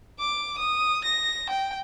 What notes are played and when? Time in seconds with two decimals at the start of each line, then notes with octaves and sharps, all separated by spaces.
0.20 D6
0.59 D#6
1.05 A#6
1.50 G5